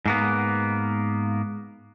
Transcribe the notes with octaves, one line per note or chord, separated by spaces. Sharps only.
G#2 A#3 B3